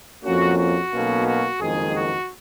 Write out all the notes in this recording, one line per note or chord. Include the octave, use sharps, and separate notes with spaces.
F2 F3 A#3 C#4 F#4
F#4
B1 B2 A#3 C#4
F#4
F#1 F2 D#3 G#3 G#4
F#4